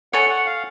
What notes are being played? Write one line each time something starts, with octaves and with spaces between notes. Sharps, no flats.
A4 C#5 F#5 G#5
F#5
F5